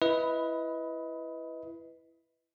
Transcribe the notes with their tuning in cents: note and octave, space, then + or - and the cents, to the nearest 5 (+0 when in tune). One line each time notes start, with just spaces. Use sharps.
E4 +10 B4 +0 D#5 +25